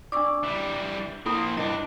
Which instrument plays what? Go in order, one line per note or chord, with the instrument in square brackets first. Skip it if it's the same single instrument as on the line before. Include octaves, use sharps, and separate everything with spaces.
[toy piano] D4 D6 [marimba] D5 C#6 E6
[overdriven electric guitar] E3 G3
[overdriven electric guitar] A#3 C5 [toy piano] E4 A4 B5
[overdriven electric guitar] G2 D4 [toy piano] E4 [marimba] D#5